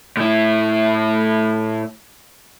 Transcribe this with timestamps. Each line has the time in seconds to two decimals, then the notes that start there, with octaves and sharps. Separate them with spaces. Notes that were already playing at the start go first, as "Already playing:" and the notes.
0.17 A2 E4